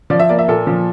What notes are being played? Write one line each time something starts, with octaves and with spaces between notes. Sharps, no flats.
F3 D5
E5
A#3 D5
E5
A#2 A4
F3